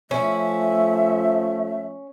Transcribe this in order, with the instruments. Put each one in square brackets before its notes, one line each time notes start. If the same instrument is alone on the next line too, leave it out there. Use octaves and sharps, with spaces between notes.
[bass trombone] F3 [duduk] A3 [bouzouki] C#4 [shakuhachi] E5